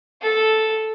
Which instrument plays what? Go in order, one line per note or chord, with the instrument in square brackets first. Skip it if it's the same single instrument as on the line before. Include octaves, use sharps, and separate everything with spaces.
[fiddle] A4